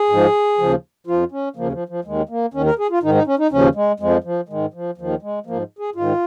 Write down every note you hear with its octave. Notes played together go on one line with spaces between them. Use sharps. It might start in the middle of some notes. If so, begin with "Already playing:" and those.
Already playing: G#4
G#2 F3
D#2 C#3 F3
F2 F3 F4
C#4
D#2 C#3 F3 A#3
F3
F3
D#2 D#3 G#3
A#3
D#2 D#3 C#4
A#4
G#4
F4
G#2 D#3 D#4
D#4
C#4
D#4
D#2 C#3 F3 C#4
G#3
F2 F3 G#3
F3
G#2 D#3 G#3
F3
D#2 D#3 F3
G#3
G#2 F3 A#3
G#4
G#2 D#3 F4